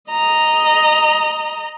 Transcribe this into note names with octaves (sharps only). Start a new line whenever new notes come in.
D#5 A#5